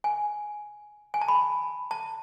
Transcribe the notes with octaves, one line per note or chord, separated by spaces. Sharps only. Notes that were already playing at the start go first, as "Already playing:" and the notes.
G#5
G#5
A5
B5
A5